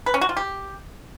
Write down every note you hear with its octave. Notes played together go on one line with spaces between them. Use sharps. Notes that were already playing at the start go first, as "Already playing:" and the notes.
B4
C#4
F#4
F4
G4